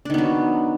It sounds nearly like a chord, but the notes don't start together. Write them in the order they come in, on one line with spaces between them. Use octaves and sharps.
D4 D#3 B3 F#3